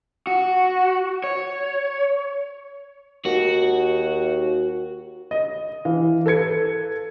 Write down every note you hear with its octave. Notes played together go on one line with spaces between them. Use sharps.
F#4
C#5
D#2 F#4
D#5
E3 F5
A4 B4 G#6 C#7